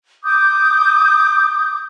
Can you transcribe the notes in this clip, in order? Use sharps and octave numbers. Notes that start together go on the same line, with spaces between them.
D6 D#6 G6